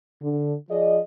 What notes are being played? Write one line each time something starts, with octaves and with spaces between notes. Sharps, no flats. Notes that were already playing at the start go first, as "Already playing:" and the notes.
D3
F3 G#4 D5 D#5